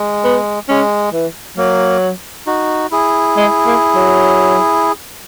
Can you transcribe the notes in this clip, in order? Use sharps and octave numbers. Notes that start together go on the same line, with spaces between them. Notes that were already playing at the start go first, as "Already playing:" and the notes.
Already playing: G#3
B3
G#3 C#4
E3
F#3 A#3
D#4 F#4
E4 G#4
G#3
A#3
F#3